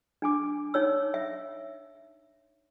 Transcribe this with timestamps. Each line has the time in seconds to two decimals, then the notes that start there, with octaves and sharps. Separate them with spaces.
0.22 D4 G#5 D6
0.74 D#4 C#5 E6
1.14 E5